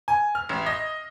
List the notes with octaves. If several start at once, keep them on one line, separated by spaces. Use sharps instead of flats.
G#5
F6
A1
D#5